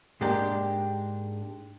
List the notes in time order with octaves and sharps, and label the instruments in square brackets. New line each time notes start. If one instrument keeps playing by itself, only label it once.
[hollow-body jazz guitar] G#2 G#3 A#3 D4 G4